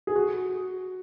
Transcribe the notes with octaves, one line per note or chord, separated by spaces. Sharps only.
G#4
F#4